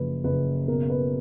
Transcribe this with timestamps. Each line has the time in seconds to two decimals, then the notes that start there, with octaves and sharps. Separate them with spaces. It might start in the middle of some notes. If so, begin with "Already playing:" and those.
Already playing: F#1 F3 B4
0.24 F#1 B4
0.68 B2 A#4
0.90 B4